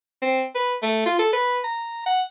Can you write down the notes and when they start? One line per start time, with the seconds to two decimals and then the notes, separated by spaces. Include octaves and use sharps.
0.22 C4
0.55 B4
0.82 A3
1.06 F4
1.19 A4
1.33 B4
1.64 A#5
2.06 F#5